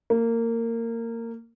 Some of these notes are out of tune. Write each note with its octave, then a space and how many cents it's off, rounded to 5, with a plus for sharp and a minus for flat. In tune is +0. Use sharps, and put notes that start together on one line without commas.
A#3 -20